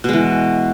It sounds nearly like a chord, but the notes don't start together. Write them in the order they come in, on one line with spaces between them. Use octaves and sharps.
B2 G#3 E3